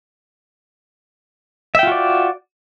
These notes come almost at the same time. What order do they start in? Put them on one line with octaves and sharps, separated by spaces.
E5 G5 F4 F#4 D5